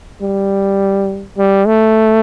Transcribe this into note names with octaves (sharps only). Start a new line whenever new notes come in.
G3
G3
A3